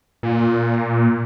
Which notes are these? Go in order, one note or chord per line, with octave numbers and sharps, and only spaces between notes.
A#2